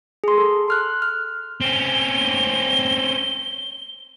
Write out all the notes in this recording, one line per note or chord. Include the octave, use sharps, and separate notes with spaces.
G#4 C6
A4
C6 F6 F#6
F6
C4 C#4 G7